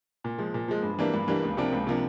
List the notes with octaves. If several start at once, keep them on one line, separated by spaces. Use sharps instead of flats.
A#2
F3 G#3
A#2
F3 G#3
G2
E3 G3 A#3 D4
G2
E3 G3 A#3 D4
C#2
C3 F3 A#3 D4
C#2
C3 F3 A#3 D4